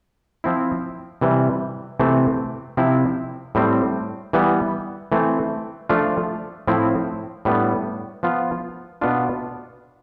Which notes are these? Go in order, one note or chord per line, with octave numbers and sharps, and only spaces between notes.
F3 C4 E4
C3 E3 G3
C3 E3 A3 C4
C3 F3 C4 E4
A2 G3 C4
E3 G3 B3
E3 A3 C4
F3 A3 D4 F4
A2 F3 C4 E4
A2 G3 B3 D4
F3 B3 F4
B2 B3 D4 F4